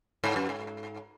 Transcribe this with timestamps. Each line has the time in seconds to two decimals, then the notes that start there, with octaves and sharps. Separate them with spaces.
0.24 G#2
0.36 F#2
0.49 G#2